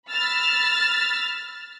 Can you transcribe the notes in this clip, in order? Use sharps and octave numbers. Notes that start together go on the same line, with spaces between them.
B5 E6 F6 A6